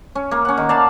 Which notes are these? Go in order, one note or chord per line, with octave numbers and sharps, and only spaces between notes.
C#4
A#3
C#4 F#5
D#3
D5 F5 A5 B5